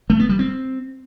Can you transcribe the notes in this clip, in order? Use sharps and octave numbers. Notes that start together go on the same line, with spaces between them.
A3
B3
G3
C4